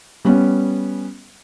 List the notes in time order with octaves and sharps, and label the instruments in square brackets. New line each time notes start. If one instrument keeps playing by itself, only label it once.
[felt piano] G3 B3 C#4